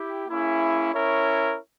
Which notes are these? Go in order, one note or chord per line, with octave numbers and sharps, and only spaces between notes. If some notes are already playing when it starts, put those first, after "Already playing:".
Already playing: E4 G4
A#3 C#4 E4 G#4
C#4 E4 A#4 C#5